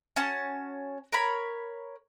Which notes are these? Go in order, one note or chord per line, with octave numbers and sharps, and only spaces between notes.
C#4 F#4 A5 C#6
A#4 C#5 B5